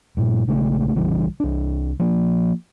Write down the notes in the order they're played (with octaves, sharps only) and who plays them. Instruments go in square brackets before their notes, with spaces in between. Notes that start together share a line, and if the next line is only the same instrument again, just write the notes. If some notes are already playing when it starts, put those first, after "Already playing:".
[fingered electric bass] G2 A#2
A#1 C#3 G#3 A3
A#1 C#3 E3 G3
C2 D4
F3 A#3